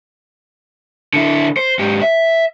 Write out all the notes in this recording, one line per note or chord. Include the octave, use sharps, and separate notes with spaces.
D3 E4
C5
G#2 G4
E5